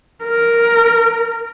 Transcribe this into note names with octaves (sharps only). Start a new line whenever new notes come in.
A#4